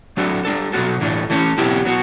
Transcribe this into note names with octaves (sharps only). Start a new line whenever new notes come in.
F#3 A3 D4 F#4 A4
G3 D4 A4
B2 F#3 B3 F#4 A4
A2 E3 A3 D4
E3 A3 C#4
B2 F#3 B3 E4 G4
F#3 B3 F#4